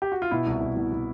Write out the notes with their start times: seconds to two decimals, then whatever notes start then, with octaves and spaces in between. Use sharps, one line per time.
0.02 G4
0.12 F#4
0.22 F4
0.31 B2 E4
0.46 C2
0.61 C2
0.77 B2
0.92 B2